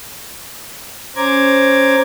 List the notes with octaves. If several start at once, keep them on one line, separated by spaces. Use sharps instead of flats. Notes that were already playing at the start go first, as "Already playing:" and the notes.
C#4 C5 A#5 D6 G#6